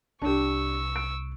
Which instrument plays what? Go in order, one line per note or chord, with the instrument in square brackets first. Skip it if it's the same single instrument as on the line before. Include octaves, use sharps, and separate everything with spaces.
[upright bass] C2 [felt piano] D4 G4 [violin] C#6 E6
[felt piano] D7